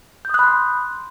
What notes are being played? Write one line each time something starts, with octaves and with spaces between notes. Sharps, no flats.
B5 C6 D#6 F#6 G6